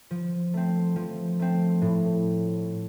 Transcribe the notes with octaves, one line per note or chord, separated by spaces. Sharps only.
F3
A3 C4
F3
A3 C4
A2